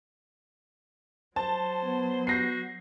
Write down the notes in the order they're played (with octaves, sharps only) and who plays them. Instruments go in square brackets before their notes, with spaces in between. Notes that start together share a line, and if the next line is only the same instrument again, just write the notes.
[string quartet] F#3 [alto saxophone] C5 [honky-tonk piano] A5
[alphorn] B3
[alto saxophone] F#4 [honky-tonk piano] G6 A#6 C7